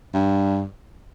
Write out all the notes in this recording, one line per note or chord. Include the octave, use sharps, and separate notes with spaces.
G2